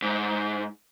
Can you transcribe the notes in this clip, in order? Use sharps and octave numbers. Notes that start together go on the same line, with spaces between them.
G#2